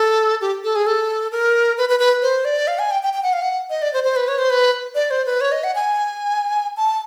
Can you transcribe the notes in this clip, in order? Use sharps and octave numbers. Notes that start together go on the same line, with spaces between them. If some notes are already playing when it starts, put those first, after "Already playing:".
Already playing: A4
G4
A4
G#4
A4
A#4
B4
B4
B4
C5
D5
F5
G#5
G5
G5
G5
F#5
F5
F#5
D#5
D5
C5
C5
B4
C#5
C5
B4
D5
C5
B4
C#5
D#5
F#5
G#5
A5